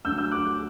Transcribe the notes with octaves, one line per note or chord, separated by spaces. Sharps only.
D2 D3 F#3 E6 G6
E6 G6
D6 F#6